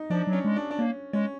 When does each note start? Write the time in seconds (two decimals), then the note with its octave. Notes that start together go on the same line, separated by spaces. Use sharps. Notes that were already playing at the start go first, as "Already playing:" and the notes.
Already playing: D#4
0.10 F3 D4
0.27 F#3
0.33 C#4
0.45 G#3
0.56 D4
0.71 D4
0.79 A#3 C#4
1.13 G#3 C#4